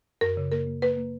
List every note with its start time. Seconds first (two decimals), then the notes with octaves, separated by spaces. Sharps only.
0.21 F#2 A#4
0.37 C#3
0.52 A#3 A#4
0.67 A#3
0.82 A#3 B4
0.97 A#3